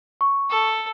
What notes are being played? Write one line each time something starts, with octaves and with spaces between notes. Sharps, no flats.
C#6
A4